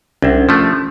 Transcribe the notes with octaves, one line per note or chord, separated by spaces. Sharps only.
C2 C#4 D4
F3 A3